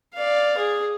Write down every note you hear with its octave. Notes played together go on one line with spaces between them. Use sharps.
D5 F5
G#4